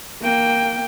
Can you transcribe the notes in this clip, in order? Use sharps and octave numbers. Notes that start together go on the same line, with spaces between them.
A#3 G5